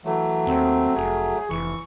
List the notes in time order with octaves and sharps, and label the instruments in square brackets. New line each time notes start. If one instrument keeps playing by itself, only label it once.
[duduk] E3 [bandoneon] F#3 A3
[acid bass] D#2 [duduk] C4
[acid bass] F1 [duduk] G#4
[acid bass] F1 [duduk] E3 [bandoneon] C#6